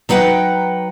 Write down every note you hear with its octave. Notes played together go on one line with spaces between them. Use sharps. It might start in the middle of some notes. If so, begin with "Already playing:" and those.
F#3 D#4 B4 F#5 G5